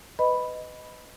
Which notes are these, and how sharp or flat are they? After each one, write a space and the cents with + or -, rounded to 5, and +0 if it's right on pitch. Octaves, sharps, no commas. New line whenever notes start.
B4 +20 D#5 +0 B5 +0